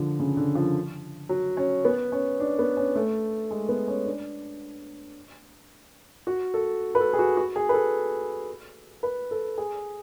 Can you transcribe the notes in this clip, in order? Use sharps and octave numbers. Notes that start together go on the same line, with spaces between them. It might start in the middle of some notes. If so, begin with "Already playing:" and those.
Already playing: D3 F3
C#3
D3
F3
F#3
C#4
B3
C#4
D4
B3
C#4
A3
G#3
B3
C#4
D4
F#4
A4
B4
A4
G#4
F#4
F#4
G#4
B4
A4
B4
A4
G#4